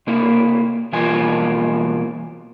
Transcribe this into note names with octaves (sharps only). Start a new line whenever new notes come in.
C3 A#3 E4
B2 E3 G3 A#3 F4 G#5